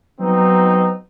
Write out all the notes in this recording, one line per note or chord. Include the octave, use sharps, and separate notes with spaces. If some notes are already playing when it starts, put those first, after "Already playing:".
F#3 B3 C4 D#4